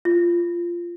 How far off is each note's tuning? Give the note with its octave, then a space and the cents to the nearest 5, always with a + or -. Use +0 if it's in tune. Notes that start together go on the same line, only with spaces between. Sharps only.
F4 -15